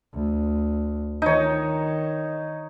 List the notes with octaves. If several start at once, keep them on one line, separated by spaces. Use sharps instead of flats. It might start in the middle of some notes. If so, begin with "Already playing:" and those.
D2
D#3 D#4 C#5